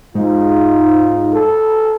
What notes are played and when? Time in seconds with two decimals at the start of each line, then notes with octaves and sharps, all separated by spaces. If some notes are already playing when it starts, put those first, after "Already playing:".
0.15 G#2 D#4 F4
1.33 A4